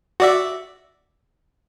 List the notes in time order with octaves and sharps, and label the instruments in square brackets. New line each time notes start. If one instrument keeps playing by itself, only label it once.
[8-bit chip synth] F#4 D5 E5